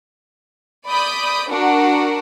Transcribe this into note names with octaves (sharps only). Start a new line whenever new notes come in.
D5 B5 D#6 G6
D4 F#4 A#4 F#5